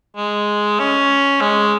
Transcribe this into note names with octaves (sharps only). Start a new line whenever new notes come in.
G#3
C#4
G#3